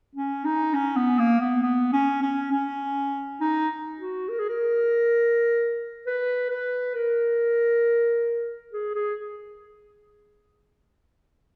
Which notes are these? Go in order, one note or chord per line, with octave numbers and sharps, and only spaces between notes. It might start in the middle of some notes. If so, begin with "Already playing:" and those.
C#4
D#4
C#4
B3
A#3
B3
B3
C#4
C#4
C#4
D#4
F#4
A#4
G#4
A#4
B4
B4
A#4
G#4
G#4